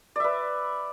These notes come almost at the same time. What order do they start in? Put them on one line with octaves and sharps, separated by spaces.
D5 E5 B4